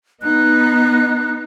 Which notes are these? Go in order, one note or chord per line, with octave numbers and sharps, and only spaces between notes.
B3 D#4 F#6